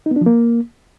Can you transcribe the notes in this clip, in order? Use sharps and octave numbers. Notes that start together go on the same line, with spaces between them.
D#4
B3
D4
F3
A#3